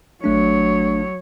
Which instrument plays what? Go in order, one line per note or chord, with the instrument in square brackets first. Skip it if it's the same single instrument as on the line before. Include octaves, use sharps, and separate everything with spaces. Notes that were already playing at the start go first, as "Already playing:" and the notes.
[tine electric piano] G#1 A3 D4 [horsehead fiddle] F#3 C#5